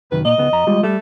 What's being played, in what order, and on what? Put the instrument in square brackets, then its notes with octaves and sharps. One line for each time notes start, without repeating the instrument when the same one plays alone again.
[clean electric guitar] C2 F#2 D#3 [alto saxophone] B4
[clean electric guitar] A#2 [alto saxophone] D#5
[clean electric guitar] C#2 B3
F2 A#5
G3 G#3 F4
[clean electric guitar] G3 [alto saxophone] A3